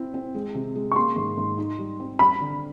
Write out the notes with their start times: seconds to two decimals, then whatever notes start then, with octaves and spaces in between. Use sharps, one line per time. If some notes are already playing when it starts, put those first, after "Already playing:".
Already playing: C4 E4
0.14 C4
0.35 G#3
0.55 C3
0.75 G#3
0.92 C#6
0.95 A#3 C6
1.16 G#2
1.37 G#2
1.58 D#4
1.78 G3
2.00 C4
2.19 G3 B5
2.40 D3